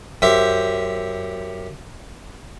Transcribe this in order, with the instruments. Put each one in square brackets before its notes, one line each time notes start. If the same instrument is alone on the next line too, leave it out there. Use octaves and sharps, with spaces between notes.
[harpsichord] F#2 G4 C5 E5